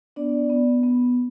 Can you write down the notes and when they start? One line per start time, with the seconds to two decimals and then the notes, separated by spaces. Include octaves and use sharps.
0.16 B3 D4 D5
0.50 B3
0.83 B3